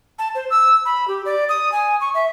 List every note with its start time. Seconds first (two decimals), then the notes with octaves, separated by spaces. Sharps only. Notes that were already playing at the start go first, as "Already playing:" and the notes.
0.19 A5
0.35 C5
0.51 E6
0.85 B5
1.08 G4
1.25 D5
1.49 D#6
1.72 G#5
2.01 C#6
2.14 E5